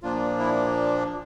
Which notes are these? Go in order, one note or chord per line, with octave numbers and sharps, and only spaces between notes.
A#2 F3 A#3 D4 F4
E4